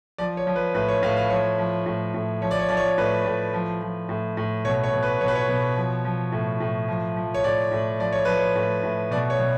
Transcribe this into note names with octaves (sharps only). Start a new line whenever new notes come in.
F3 D5
C#5
F3
B4
A2 B4
C#5
A2 F5
F5
F3 C#5
F3
A2
A2
F3 C#5
D5
C#5
F3 D5
C#5
A2 B4
A2
F3
F3
A2
A2
B2 C#5
C#5
B2
B4
B2 C#5
B4
C#5
B2
F3
F3
A2
A2
F3
F3
C#5
A2 D5
A2
F3 D5
C#5
F3 B4
C#5
A2
A2
B2 D5
C#5
B2